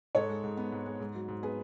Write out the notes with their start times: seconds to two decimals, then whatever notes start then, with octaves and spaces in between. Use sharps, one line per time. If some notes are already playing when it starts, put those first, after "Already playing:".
0.15 G#2 A4 C#5
0.29 G#3
0.44 G#2
0.57 B3
0.72 G#2
0.86 G#3
1.00 G#2
1.15 F#3
1.28 G#2
1.43 B3 G#4 B4